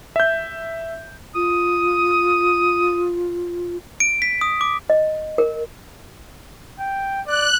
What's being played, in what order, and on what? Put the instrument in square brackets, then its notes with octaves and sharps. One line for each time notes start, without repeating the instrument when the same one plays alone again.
[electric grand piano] E5 G6
[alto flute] F4 [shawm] D#6
[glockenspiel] D7
B6
D#6
D6
[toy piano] D#5
A#4
[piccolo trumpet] G5
[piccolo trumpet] D5 [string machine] F#6